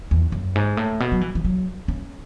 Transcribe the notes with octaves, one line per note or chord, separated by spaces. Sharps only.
E2
F#2
G#2
A2
B2
F#3
E3
E3
F#3
C#4